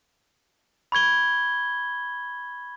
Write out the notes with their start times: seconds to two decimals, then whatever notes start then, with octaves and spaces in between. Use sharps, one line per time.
0.92 B5 C#6 G#6 G7